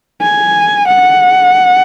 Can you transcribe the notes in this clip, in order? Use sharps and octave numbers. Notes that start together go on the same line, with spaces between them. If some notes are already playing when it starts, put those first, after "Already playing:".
G#5
F#5